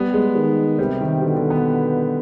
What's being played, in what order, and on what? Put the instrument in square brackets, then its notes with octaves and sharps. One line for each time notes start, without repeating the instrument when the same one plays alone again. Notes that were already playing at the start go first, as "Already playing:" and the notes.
Already playing: [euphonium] G3 [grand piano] B3
[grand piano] G#3
[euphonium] D#3
[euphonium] C3 [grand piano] G3
[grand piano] D#3
[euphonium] B2 [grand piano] D3
[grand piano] D3
B3